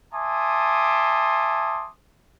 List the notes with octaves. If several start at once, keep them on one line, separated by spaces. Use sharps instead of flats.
E5 G#5 A5 C6 D6 D#6